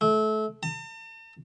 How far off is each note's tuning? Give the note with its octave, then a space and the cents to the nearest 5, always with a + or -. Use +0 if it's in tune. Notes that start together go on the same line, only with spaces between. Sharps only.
A3 -25
A5 +45